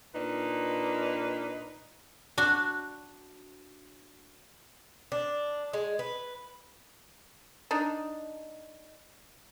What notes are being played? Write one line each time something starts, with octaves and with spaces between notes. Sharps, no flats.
A#2 D4 D#4 B4
D4 F#4
D4
G#3
B4
D4 D#4